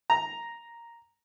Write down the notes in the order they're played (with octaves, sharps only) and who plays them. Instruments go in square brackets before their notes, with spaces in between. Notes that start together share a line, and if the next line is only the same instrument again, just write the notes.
[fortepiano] A#5